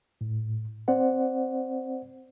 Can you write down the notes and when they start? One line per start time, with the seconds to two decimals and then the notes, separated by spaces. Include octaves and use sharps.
0.21 A2
0.88 C4 C5 D5 F#5